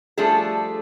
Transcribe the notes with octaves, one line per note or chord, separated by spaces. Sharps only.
F3 G3 A3 D4 G#4 A4